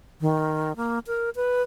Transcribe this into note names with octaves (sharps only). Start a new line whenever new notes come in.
D#3
A#3
A#4
B4